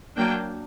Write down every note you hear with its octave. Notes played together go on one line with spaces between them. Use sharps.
F#3 A#3 D4 G5